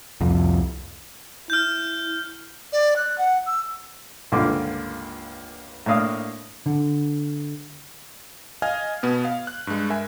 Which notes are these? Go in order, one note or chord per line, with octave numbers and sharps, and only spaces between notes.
C2 F2
E4 F6 G6
D5
F#6
F#5
E6
C#2 G2 D3 A#3 F4 D6
A2 A#3 D4 F5 D#6
D3
D#5 F5 G#5 F6 G#6
B2 B3
F5
F#6
G2 G#3
A#4 E5 G#5